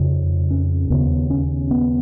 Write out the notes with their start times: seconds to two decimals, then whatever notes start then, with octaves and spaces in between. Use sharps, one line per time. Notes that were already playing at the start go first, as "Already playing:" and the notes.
Already playing: F2 C#3
0.51 C#4
0.90 D#2 C#3 B3
1.30 C#4
1.71 B3